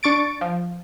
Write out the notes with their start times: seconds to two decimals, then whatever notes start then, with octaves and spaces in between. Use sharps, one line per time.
0.03 D4 C#6 A6 D7
0.41 F3